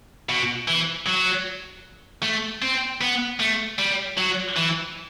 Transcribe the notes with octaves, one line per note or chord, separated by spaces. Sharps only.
B2
E3
F#3
A3
C4
B3
A3
G3
F#3
E3